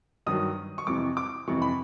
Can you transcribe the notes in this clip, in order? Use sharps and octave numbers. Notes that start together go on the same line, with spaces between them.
G2 D#3 F#3 D#6
C#6
F2 C3 E3 D6
D6
F2 C3 E3 C#6
B5